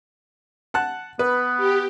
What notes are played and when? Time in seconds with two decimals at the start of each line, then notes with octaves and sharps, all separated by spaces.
0.74 F#5 A5 F#6
1.19 B3 B4
1.57 G4